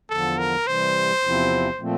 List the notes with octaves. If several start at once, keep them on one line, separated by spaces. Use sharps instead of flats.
E2 D3 F3 A4
A#4
C3 E3 G3 C5
E2 C3 F3 C4 E4
A#2 F3 A3 C4